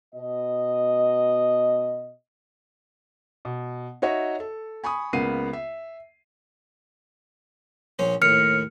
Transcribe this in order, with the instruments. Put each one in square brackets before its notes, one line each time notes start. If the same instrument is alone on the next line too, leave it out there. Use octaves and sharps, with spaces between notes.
[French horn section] B2 D#5
[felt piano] B2
D#4 F#4 C#5 D#5 E5
A4
G#5 B5 C#6 D#6
C#2 C#3 A#3 B3 C7 D#7
E5
[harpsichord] A#1 C#4 C5
[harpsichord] D#2 A2 [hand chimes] F6 C#7